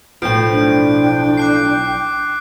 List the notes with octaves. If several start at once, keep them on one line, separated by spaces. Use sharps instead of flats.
B1 A2 F3 G5 G6 D7
D4
D6 F#6 C7